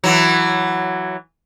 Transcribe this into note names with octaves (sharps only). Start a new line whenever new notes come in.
E3 F#3